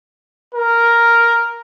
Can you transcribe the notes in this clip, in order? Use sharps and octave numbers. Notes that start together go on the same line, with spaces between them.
A#4